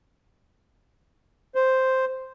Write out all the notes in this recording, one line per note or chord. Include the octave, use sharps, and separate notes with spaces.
C5